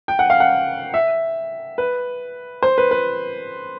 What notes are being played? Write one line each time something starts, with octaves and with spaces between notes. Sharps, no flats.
G5
F#5
F5
F#5
E5
B4
C5
B4
B4